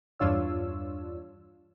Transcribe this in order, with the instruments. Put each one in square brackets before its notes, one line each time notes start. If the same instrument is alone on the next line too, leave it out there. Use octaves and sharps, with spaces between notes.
[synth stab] E2 G2 D4 F4 C#5 E6